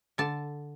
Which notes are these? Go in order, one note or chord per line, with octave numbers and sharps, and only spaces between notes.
D3 A5